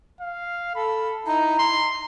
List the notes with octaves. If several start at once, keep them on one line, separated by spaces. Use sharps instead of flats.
F5
A4 B5
D#4 E4 A#5
C6